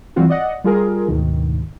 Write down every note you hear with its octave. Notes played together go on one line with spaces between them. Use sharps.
E3 G3 C4 F4 F#4
D5 D#5 F#5
G3 F4 G#4 A#4
D2 G#2 B2 D#3